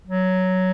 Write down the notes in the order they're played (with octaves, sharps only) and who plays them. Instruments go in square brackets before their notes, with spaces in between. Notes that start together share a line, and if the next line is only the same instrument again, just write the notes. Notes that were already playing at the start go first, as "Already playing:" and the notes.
[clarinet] F#3